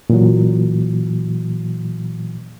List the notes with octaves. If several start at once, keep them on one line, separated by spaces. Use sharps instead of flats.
A#2 E3 F#3